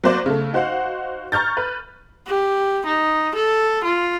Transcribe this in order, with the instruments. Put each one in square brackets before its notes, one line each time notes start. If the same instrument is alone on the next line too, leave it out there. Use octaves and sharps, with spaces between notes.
[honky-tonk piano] F#3 A#3 C5 D5
C#3 A3
D#4 F#4 C5 F5 F#5
A#5 C#6 F6 G6 A6
B4
[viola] G4
D#4
A4
F4